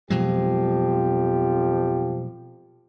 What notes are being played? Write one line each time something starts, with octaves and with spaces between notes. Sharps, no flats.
F2 B2 F3 F#3 G#3 G4